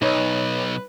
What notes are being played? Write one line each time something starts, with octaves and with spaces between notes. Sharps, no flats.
B1 D#4 B4 C#5